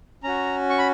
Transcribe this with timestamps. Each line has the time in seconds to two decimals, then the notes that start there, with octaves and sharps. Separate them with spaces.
0.23 C#4 F#4 A#5
0.70 C#6
0.78 B5